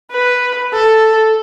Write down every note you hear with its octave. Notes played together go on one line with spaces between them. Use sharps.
B4
A4